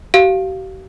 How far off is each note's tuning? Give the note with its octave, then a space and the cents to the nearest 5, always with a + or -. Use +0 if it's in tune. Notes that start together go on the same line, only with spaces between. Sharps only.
G4 -45 F5 +0